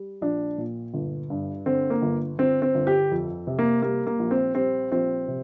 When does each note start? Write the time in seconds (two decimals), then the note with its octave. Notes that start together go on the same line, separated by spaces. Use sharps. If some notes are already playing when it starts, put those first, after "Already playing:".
Already playing: G3
0.22 A#1 D4
0.58 A#2
0.94 G1
1.30 G2
1.66 D3 C4
1.90 A#3
2.02 G1
2.39 G1 C4
2.62 C4
2.75 G1
2.87 G4
3.11 F2
3.47 C3
3.59 A#3
3.82 G3 A#3
4.07 A#3
4.19 A#1
4.31 C4
4.55 G3 C4
4.91 A#1 C4
5.28 C3